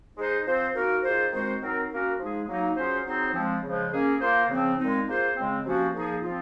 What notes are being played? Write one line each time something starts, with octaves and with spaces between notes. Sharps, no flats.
G#3 D#4 G#4 C5
F3 C4 F4 C5
A#3 D#4 F#4 A#4
D#3 A#3 F4 G#4 C5
D#3 G#3 C4 F#4 C5
F#3 C4 D#4 A#4
A#3 C#4 F#4 A#4
F3 G#3 D#4 G#4
F#3 A#3 D#4
F#3 C#4 F4 G#4 C5
F#3 C4 D#4 G#4 C5
F3 G#3 C4
C#3 F3 G#3
A#3 C#4 G#4
A#3 F4 C5
C#3 F3 C4
A#2 G#3 C4 D#4
A#3 F4 G#4 C5
C#3 G#3 C4
C3 F3 A#3 C#4 F#4
A#2 F3 A#3 D#4 G#4
F3 C4 F4